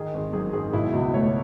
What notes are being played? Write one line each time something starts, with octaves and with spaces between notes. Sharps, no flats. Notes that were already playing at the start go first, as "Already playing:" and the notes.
Already playing: D#3 G#4
G#1
F#2 G#4
G#1 G#4
B2 E4
C#2 F#4
A3 C#5